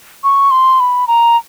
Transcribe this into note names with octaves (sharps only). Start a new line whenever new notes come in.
C#6
C6
B5
A#5